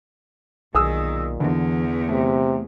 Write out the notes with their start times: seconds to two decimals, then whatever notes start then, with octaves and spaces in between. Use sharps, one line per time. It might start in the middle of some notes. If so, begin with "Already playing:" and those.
0.75 B1 A#2 D#3 G#4 D#6 E6
1.40 E2 D3 E3
2.09 C3 A3